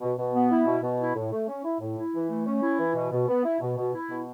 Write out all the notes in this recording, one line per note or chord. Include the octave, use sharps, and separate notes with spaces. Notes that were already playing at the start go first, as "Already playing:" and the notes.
B2
B2
B3
E4
B2
B2
E4
A2
A3
C#4
E4
A2
E4
E3
A3
C#4
E4
E3
B2
B2
B3
E4
B2
B2
E4
B2